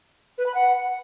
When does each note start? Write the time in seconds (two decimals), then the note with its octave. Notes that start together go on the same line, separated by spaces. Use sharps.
0.37 B4
0.46 B5
0.54 F#5